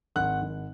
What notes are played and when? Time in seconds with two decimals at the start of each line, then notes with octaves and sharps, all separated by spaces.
0.16 G#1 F#5 F#6
0.42 G#1